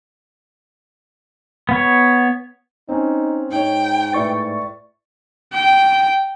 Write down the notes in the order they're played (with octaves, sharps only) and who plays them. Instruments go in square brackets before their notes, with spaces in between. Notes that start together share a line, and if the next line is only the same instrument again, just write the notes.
[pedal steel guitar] B3 C#5
[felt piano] C4 C#4 [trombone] D#4
[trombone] G#2 [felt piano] D#4 C#5 [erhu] G5
[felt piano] A2 E4 B4 [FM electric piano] D5 C#6 A6
[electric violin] G5